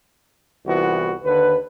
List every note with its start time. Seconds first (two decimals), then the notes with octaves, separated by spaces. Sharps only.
0.66 C2 E3 B3 F4 F#4
1.24 D#2 D3 B4